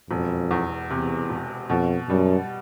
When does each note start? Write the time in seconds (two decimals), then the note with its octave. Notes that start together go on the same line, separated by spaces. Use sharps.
0.10 E1 F2
0.51 E2
0.90 E2 C3
1.30 E1
1.69 F2 B2
2.09 F#2 G3